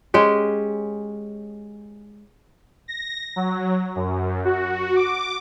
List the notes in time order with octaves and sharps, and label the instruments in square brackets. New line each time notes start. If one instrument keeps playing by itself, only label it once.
[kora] G#3 C#4 G4
[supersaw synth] A#6
F#3
F#2
F#4
D6